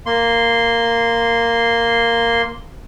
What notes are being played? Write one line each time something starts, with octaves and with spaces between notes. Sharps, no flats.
A#3 C6